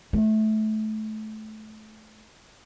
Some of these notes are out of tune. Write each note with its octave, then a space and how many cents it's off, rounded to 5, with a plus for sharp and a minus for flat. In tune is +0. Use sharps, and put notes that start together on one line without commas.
A3 -20